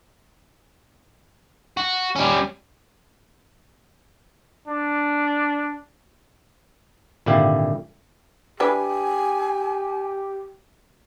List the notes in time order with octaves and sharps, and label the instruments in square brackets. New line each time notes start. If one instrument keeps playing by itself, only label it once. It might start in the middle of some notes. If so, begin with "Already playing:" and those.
[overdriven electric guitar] F#4
G3 C#4
[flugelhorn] D4
[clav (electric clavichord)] G#1 A#2 D3 E4 G4 F5
[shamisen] E3 D4 B4 [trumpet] G4 [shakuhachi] G#5